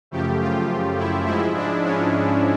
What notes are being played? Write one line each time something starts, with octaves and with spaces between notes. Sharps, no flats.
F#2 C#3 F3 A3 G4
F4
E4
G#2 F3 G#3 E4
D4
C#4